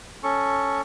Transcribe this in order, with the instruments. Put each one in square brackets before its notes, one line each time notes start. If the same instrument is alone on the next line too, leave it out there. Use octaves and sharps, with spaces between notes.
[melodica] C#4 A4 C#6